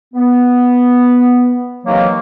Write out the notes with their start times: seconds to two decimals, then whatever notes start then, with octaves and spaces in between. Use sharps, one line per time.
0.14 B3
1.86 C3 D#3 E3 F#3 A#3